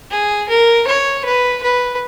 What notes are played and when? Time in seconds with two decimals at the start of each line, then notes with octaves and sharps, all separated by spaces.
0.11 G#4
0.48 A#4
0.87 C#5
1.25 B4
1.62 B4